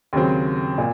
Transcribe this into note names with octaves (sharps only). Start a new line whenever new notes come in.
D#2 C#3 F#3 C4
A#2